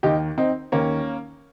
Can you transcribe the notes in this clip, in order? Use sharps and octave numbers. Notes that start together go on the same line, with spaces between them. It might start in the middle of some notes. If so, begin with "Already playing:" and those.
D#2 D#3 D#4 G4
C4 D#4
D#2 D#3 A#3 C#4